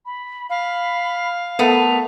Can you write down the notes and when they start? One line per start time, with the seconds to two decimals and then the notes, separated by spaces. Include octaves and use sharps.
0.06 B5
0.50 F5 B5
1.59 A3 B3 A4 A#4 F7